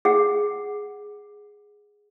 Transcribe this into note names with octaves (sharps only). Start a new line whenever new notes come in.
G#4 F#5